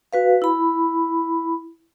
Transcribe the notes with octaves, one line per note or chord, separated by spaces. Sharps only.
F#4 B4 F5
E4 B5